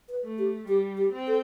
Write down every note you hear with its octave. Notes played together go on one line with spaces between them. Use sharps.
B4
A3
G4
G3 G4
G4
C4
A4